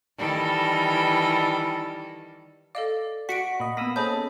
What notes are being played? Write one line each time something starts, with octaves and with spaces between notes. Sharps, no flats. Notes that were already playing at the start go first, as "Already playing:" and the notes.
D#3 E3 G3 A4
A4 D5 D#5 F5
F#4 F#5 C#6 B6 C#7 D7
A#2 D#5 B5
A#3 B3 B5 D#6 E6 A#6
C#4 G#4 A4 C5 D#5 B5 G6